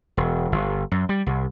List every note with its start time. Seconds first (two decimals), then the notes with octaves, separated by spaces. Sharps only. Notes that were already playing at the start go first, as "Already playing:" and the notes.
0.17 E1
0.52 G1
0.92 F#2
1.09 G3
1.26 C2